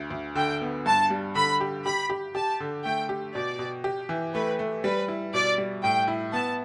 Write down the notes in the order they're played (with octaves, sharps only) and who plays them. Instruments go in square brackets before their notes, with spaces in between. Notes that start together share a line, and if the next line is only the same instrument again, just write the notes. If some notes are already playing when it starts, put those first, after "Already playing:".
Already playing: [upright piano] D2
D2
[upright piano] D3 [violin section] G5
[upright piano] B3
[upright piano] G2 [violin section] A5
[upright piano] G3
[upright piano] D3 [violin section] B5
[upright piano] G4
[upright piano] G4 [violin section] B5
[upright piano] G4
[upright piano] G4 [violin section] A5
[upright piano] D3
[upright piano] A3 [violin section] G5
[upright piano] G4
[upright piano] B2 [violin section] D5
[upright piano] B2
G4
E3
[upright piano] A3 [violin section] B4
[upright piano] A3
[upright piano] G3 [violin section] B4
[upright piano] E4
[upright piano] B2 [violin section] D5
[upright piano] G3
[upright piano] A2 [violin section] G5
[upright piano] E4
[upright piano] B3 [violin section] A5